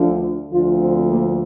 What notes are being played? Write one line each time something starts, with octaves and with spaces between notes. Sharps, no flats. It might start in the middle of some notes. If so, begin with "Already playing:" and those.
Already playing: D2 D3 F3
D2 D3 F3 F4
C4
A#3